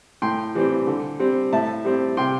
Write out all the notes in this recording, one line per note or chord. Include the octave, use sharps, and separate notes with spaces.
A2 G5 C6
E3 G3 C4
D3
G3 C4
A2 E5 A5
G3 C4
C3 G5 C6